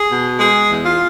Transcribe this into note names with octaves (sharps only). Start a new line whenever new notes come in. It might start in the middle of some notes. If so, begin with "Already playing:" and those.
Already playing: G#4
B2
G#3 G#4
E2
F4